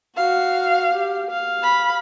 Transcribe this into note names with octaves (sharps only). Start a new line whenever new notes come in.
F#4 F5
G4
F5
B5